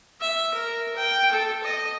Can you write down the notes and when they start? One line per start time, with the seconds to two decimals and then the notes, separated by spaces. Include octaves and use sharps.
0.20 E5
0.54 A#4
0.96 G5
1.31 A4
1.63 D#5